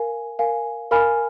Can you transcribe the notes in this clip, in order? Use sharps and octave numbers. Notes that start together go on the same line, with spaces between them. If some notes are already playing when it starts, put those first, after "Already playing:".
Already playing: A#4 F5 G#5
A#4 F5 G#5
A#4 F5 G#5 B5 F6